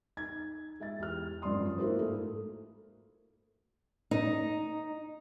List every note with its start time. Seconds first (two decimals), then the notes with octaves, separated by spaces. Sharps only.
0.17 D#4 G#6
0.80 G#3 E5 A6
0.99 E2 G4 F6
1.42 G#1 F#2 F3 D5 C6 D#6
1.78 A#3 D#4 E4 F#4 A#4 C5
1.99 G#2 A3
4.11 D#4